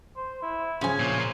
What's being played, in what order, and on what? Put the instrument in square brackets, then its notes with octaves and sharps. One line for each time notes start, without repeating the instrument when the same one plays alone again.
[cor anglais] C5
E4
[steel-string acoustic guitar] C#3 F3 [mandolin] C#4 G#5 [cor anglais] C5
[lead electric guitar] A#2